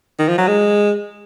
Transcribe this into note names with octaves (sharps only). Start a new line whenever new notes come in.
D#3
F3
F#3
G#3